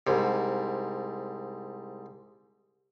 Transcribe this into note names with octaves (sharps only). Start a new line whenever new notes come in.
C2 G#2